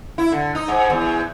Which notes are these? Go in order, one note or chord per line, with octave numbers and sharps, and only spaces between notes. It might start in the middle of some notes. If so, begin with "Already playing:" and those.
E4
D3
D#4
G#2
E2